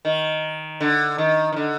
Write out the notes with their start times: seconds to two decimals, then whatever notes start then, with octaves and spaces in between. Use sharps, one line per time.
0.05 D#3
0.81 D3
1.18 D#3
1.52 D#3
1.56 D3